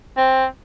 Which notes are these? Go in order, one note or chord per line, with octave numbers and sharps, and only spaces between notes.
C4